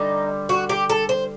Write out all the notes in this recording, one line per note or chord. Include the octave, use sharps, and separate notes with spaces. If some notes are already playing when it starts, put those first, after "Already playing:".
Already playing: D3 G3 D#4
F#4
G4
A4
C5